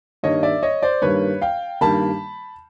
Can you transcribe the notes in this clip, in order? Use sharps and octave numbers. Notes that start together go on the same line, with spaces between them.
G2 D#3 G3 A#3 C#5 D#5
D5 E5
C#5 D#5
C5 D5
G2 D#3 G3 A#3 B4 C#5
F5 G5
G2 D#3 G3 A#3 A5 B5